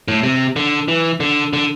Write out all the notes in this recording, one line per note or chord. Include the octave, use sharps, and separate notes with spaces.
A2
C3
D3
E3
D3
D3